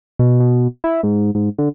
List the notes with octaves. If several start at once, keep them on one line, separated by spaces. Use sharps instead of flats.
B2
B2
E4
G#2
G#2
D3